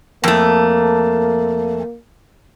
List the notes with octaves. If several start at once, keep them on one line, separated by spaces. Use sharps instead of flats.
F2 A3 A#3